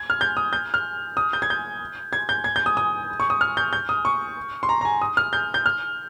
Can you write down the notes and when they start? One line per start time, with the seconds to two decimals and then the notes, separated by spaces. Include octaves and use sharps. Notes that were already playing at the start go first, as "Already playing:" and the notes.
Already playing: G#6
0.10 F6
0.21 G6
0.37 D#6
0.53 G6
0.74 F6
1.17 D#6
1.33 G6
1.42 G#6
1.50 G6
2.13 G#6
2.29 G6
2.44 G#6
2.56 G6
2.66 D#6
2.77 D#6
3.20 C#6
3.30 D#6
3.41 F6
3.57 G6
3.73 G6
3.89 D#6
4.05 C#6
4.63 C6
4.69 A#5
4.81 A#5
4.85 G#5
5.02 D#6
5.17 F6
5.33 G6
5.54 G6
5.66 F6